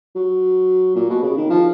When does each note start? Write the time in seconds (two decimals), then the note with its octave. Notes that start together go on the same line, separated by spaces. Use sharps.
0.15 F#3
0.96 A#2
1.09 B2
1.23 C#3
1.37 D#3
1.50 F3